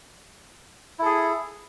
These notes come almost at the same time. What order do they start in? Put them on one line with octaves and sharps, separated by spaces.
E4 A4 G#4